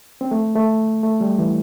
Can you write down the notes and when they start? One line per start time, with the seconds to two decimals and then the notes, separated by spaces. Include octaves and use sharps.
0.21 C4
0.31 A3
0.55 A3
1.03 A3
1.21 G3
1.38 E3